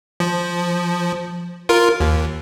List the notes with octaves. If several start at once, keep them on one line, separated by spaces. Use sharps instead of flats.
F3
F4 A#4
D#2